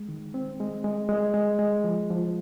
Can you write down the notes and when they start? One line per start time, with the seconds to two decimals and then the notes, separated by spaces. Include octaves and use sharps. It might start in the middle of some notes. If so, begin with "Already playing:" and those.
Already playing: G#3
0.09 D#3
0.34 C4
0.60 G#3
0.84 G#3
1.09 G#3
1.34 G#3
1.59 G#3
1.84 F3
2.10 F3